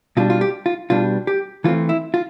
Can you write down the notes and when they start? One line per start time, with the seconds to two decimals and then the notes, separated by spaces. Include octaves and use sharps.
0.17 B2 G3 D4 F4
0.30 F4
0.41 G4
0.66 F4
0.90 B2 G3 D4 F4
1.27 G4
1.64 E3 A3 C4 F4
1.89 E4
2.14 F4